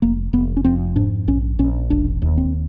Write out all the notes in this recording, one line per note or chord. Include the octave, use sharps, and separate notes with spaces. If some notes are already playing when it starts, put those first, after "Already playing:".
F1 A#3
F1 B3
C#4
F2 C4
G#2 D4
A#1 C#4
A#1 C#4
E1 D4
D#2
C4